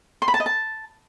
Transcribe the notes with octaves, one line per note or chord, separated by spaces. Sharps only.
C6
B5
A5
D#5
A5